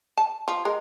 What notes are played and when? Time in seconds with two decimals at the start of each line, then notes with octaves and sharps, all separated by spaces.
0.17 A5
0.48 F3
0.65 G#3 A#4